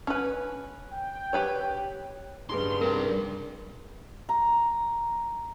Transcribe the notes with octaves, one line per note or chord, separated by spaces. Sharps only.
C#4 B4
G5
G4 B4 C#5
G2 C#3 D#4 G#4 B4 C6
G3 C4 A#4
A#5